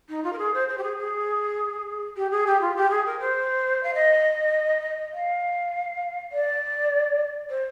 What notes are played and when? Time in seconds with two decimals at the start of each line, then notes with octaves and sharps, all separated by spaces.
0.09 D#4
0.24 F4
0.33 A#4
0.38 G#4
0.54 C5
0.68 C5
0.78 G4
0.83 G#4
0.98 G#4
2.17 G4
2.31 G#4
2.47 G4
2.61 F4
2.76 G4
2.90 G#4
3.06 A#4
3.20 C5
3.83 F5
3.94 D#5
5.13 F5
6.32 D5
7.49 C5